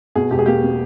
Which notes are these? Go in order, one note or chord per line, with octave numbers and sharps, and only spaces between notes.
B2 G#4
E1 G4
G#4
A#3 G4
A#3